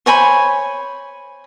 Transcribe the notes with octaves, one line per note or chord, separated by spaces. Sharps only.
C5 C#5 G#5 B5